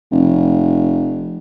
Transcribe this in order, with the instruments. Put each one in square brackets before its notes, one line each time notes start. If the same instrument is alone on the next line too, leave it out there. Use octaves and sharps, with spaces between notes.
[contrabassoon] F1